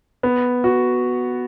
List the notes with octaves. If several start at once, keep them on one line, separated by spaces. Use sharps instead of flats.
B3
F#4